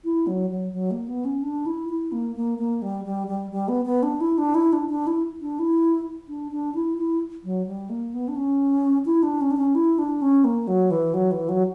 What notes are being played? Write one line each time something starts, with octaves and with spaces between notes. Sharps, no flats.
E4
F#3
F#3
F#3
A#3
B3
C#4
D4
E4
E4
A#3
A#3
A#3
G3
G3
G3
G3
B3
B3
D4
E4
D4
E4
D4
D4
E4
D4
E4
D4
D4
E4
E4
F#3
G3
A#3
B3
D4
C#4
E4
D4
C#4
D4
C#4
E4
D4
C#4
A#3
F#3
E3
F#3
E3
F#3